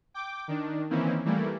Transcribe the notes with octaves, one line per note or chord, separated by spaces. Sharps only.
G5 D6
D#3 D4
D#3 E3 A#3 C4 C#4 E4
E3 G3 A3 A#3 E4